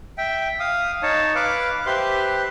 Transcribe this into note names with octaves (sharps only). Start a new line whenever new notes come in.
E5 G5
F5 D#6
D#4 C#5 A5
B4 F5 D6
G4 B4 C5 E5 C6